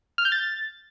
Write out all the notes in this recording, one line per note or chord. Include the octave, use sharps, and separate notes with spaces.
F6
G6
A6